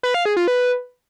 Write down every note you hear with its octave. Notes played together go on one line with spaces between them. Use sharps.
B4
F5
G#4
F4
B4